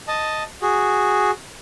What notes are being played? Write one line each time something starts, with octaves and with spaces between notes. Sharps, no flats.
D#5 A5
F#4 G#4